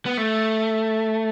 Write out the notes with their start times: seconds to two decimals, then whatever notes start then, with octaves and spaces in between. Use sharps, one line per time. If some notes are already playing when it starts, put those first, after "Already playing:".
0.06 B3
0.17 A3